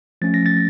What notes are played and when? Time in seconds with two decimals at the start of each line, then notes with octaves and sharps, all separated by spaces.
0.22 F3 A3 C#4 A6
0.34 A#6
0.46 A6